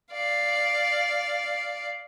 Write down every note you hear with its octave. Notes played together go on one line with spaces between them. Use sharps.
D5 F5